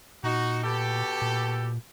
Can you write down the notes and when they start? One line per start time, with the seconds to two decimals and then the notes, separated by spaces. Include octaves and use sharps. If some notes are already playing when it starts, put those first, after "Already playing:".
0.24 A#2 D#4 F#4
0.64 B2 G4 A4
1.22 A#2